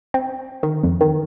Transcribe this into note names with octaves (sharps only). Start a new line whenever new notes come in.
C4
D#3
F2
D#3